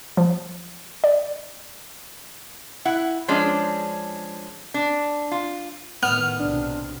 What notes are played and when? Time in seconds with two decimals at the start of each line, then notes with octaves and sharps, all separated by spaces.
0.17 F3
1.04 D5
2.85 E4 F#5
3.28 F3 G#3 C#4 D4
4.74 D4
5.31 F4
6.03 A2 D#3 B3 F6
6.40 B1 C3 D4